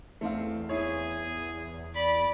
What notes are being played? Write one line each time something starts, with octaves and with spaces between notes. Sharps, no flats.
E2 A3 C4 F5
E4 G#4 C#5
D5 B5